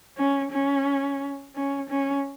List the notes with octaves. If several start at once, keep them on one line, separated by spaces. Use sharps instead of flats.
C#4
C#4
C#4
C#4